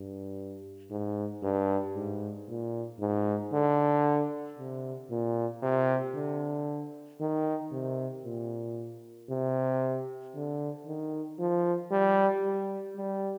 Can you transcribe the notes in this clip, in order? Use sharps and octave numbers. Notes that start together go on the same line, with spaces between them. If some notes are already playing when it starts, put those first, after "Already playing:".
Already playing: G2
G#2
G2
G#2
A#2
G#2
D3
C3
A#2
C3
D3
D#3
C3
A#2
C3
D3
D#3
F3
G3
G3
G3